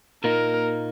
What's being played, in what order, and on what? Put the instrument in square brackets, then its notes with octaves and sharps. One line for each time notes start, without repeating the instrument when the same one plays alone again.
[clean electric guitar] A#2 A#3 D#4 [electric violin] A#4